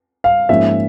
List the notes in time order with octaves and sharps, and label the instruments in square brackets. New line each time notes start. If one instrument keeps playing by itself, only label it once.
[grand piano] F5
[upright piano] G#2 F3 A#3 C#4 F4 [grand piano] E5